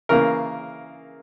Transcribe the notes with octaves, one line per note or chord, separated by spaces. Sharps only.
C#3 E3 A#3 A#4